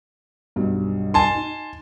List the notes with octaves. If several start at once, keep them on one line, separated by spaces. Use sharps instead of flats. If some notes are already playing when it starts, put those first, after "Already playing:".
B1 G2 B2
G#5 A5 C6
D#4